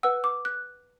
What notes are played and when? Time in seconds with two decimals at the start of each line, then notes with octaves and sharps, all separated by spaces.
0.03 B4 F#5 E6
0.24 D6
0.45 F#6